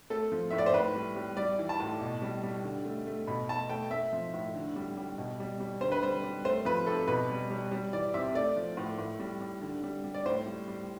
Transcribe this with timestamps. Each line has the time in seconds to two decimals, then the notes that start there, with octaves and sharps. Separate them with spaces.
0.10 A3 A4
0.32 F3
0.51 A2 E5
0.58 D5
0.66 C5
0.73 A2 B4
0.95 G3
1.16 G3
1.37 G3 D5
1.59 E3
1.69 A5
1.80 A2
2.01 B2
2.22 G3
2.43 G3
2.64 D3
2.85 A3
3.07 A3
3.27 B2 B5
3.49 A3 A5
3.69 A3 G5
3.91 A3 E5
4.13 F3
4.34 A2
4.54 D3
4.76 G3
4.97 G3
5.18 B2
5.40 G3
5.60 G3
5.81 D3 C5
5.92 B4
6.02 G3 C5
6.23 G3
6.45 A3 C5
6.65 F3 B4
6.87 C3 A4
7.08 B2 B4
7.30 G3
7.50 G3
7.71 G3
7.93 E3 D5
8.14 C3 E5
8.34 A3 D5
8.56 F3
8.77 A2
8.98 A2
9.20 G3
9.41 G3
9.62 D3
9.83 G3
10.04 G3
10.14 D5
10.26 A2 C5
10.46 G3
10.68 G3